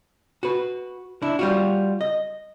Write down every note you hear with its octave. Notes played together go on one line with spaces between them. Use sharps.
F#4 B4
D4 E4
G3 F4 F#4
D#5